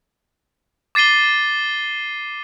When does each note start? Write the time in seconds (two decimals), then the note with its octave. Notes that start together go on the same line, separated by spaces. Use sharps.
0.95 D6 A6 C7 D#7 G7